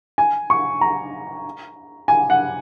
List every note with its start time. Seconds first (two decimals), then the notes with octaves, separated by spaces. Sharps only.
0.18 G#5
0.50 C#6
0.81 A#5
2.08 G#5
2.30 F#5